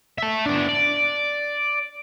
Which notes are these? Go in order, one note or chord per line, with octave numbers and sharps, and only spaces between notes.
E5 A5
B3 D4
D5